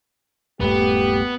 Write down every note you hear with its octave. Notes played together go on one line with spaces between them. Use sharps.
D#1 G2 A3 B3 G4